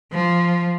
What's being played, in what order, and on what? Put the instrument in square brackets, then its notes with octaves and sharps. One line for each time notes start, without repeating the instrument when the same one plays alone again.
[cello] F3